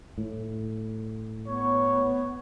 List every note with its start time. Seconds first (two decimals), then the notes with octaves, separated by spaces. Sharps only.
0.18 A2
1.48 B3 C#5